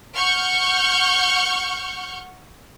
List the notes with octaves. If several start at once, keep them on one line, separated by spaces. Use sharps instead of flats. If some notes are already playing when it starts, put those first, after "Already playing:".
F#5 C#6 F6 G6